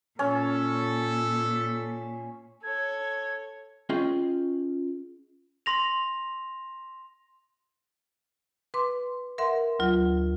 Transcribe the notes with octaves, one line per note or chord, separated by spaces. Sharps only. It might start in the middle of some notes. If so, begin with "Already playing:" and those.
A#2 C#4 A4
A4 C#5 G#6
C#4 F4 G#4 D#5 G5
C6 A#6 F7
B4 C6 D6
A#4 E5 F#5 C6
D2 F#3 F4